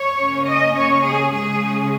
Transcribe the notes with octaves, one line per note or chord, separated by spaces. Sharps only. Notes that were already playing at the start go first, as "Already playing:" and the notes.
Already playing: C#5
C#3 A#3 C#4
D#5
C#5
G#4
C#3 G#3 C#4 G#4